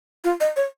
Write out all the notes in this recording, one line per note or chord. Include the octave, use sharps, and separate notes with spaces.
F4
D#5
C#5